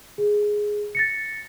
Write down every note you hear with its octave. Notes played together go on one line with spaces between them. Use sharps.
G#4
A6 A#6 C#7